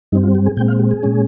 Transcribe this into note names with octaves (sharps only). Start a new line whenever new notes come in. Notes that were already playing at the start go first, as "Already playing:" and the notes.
G2 G3 C4 D#4
F4
G4
G#4
A#2 G#3 C4 G5
F5
G4
G#4
A#2 G#3 C#4